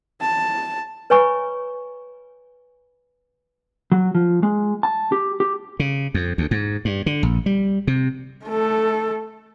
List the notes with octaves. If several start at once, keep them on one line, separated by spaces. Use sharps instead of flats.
A5
B4 C#5 D#5 G#5 B5 C#6
F#3
F3
G#3
A5
G4
G4
C#3
F2
D2
G#2
G2
D3
A#1
G3
C3
A3 A4